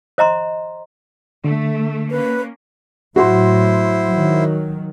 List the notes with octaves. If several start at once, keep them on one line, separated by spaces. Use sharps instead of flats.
C5 D#5 A#5 C6
D3 A3
A#3 C#4 B4
A2 F#3 E4 F#4 C5 C6
D#3 F#3